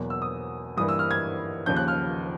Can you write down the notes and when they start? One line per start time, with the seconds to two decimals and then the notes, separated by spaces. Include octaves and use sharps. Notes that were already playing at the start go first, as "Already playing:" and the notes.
Already playing: E2 B2 F#3 A#3
0.10 E6
0.22 D#6
0.77 G2 E3 G3 A#3 D#6
0.89 E6
0.99 F6
1.11 G#6
1.66 D#2 C#3 F3 G6
1.76 F#6
1.88 F6